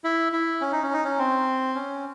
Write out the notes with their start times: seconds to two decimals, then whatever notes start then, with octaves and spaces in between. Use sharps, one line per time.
0.04 E4
0.33 E4
0.61 C#4
0.72 D#4
0.83 C#4
0.93 D#4
1.04 C#4
1.18 C4
1.75 C#4